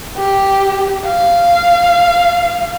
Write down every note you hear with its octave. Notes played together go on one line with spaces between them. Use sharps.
G4
F5